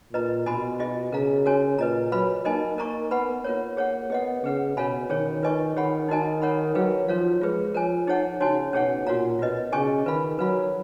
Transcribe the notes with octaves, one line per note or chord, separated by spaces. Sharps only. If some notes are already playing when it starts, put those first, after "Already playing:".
A#2 B4 D#5 A#5
B2 F#4 A#4 D#5 G#5 B5
F4 G#4 D#5
C#3 A#4 F5 A#5
F#4 A#4 C#5 G#5
A#2 B4 D#5 A#5
F#3 B4 F5 B5
A#3 D#4 A#4 D#5 G#5
A#3 A#4 D#5 A#5 C#6
B3 B4 F#5 B5
A#3 F4 A#4 C#5
G#4 C#5 F#5
B3 G#4 D#5 F#5
C#3 G#4 B4 F#5
B2 A#4 C#5 F5 G#5 B5
D#3 C#4 G#4 C#5
F4 B4 D#5 G#5 C#6
D#3 G#4 C#5 F#5 B5
D#4 F#4 A#4 D#5 G#5
A#4 C#5 F#5 B5
F#3 G#4 B4 F5
F3 A#4 C#5 F5
G#3 F4 G#4 B4
F3 A#4 C#5 G#5
D#4 G#4 C#5 F#5
C#3 D#4 F#4 C#5 G#5
B2 C#4 G#4 C#5 F#5
A#2 F#4 C#5 F5 A#5
B2 F4 B4 D#5
C#3 C#4 G#4 D#5 G#5 C#6
D#3 F4 B4 F5 B5
F#3 B4 F5 B5